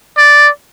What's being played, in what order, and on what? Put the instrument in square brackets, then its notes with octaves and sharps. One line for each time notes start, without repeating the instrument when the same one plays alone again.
[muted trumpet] D5